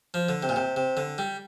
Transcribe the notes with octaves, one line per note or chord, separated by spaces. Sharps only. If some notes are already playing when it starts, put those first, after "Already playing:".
F3
D3
C3
A#2
C3
C3
D3
G3